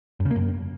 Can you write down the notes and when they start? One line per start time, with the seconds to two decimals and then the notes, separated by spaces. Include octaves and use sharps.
0.20 F#2
0.25 C#3
0.31 A#3
0.36 F#2